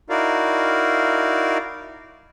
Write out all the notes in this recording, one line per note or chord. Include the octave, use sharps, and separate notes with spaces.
D#4 E4 F#4 A#4 D5 F5